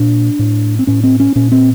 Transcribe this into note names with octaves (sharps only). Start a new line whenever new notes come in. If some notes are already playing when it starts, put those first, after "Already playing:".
Already playing: A#2 D4
A2
C4
A2 C#4
C4
C#4
A#2 C#4
C4